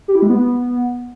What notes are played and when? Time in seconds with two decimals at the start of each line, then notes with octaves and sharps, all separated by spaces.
0.08 G4
0.15 E4
0.22 G#3
0.30 B3